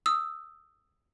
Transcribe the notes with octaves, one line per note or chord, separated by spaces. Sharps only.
D#6 E6